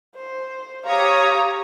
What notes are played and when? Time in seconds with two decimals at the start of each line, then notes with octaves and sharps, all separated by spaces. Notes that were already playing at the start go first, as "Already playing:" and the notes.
0.16 C5
0.86 G4 C#5 F5 A#5 D#6